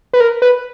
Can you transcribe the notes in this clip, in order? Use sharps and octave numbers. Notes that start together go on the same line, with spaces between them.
B4
A#4
B4